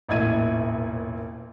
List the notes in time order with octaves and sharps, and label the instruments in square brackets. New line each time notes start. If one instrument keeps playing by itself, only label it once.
[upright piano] E1 A1 A#2 E4 G#6 D#7